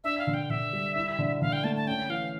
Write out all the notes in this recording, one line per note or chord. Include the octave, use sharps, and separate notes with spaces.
D4 E5
F5
D3
G5
D3 E5
G3
E4
D3
D3 F5
G5
A3 A5
A5
C#4 G5
E3 F5